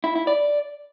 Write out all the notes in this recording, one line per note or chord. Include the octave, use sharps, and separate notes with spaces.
E4
E4
D5